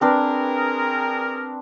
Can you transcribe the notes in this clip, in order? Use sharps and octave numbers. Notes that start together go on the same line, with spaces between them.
C4 D4 G#4 A#4 B4